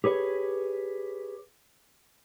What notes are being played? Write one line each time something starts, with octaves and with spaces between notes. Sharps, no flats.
G4 G#4 B4 C#5